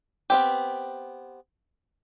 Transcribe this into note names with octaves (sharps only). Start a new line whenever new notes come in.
B3 C4 G4